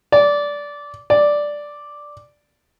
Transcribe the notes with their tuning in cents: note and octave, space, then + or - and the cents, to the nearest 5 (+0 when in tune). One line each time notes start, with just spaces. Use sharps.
D5 -15
D5 +0